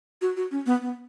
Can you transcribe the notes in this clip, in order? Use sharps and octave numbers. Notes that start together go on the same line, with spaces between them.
F#4
F#4
C#4
B3
B3